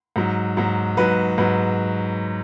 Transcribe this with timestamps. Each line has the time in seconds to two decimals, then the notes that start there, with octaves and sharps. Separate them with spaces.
0.16 G#2 F#3
0.57 G#2 F#3
0.97 G#2 F#3 B4
1.38 G#2 F#3 B4